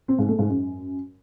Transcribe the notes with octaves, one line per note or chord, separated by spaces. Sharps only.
C4
G#2
A3
G#2
F#2